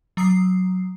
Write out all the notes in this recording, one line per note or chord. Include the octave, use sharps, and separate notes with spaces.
F#3 A#5 D#6 C7